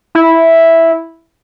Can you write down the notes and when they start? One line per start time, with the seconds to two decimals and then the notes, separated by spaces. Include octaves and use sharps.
0.15 E4